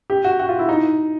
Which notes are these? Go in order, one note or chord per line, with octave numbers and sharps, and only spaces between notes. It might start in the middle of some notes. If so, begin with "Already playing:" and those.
G4
F#4
F#4
F4
E4
D#4